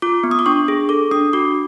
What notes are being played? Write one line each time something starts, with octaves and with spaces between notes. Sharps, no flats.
F4 D6
B3
D#6
D6
D4 C#6
G#4
A4 D6
D4 D#6
F#4 D6